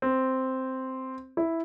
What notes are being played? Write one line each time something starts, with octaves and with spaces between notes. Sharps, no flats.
C4
E4